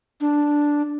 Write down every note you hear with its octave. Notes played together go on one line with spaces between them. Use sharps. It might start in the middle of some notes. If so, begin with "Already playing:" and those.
D4